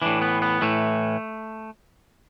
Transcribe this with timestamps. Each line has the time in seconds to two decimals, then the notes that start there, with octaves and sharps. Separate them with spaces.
0.02 A2 E3 D4
0.22 B3
0.42 B3
0.61 A2 E3 A3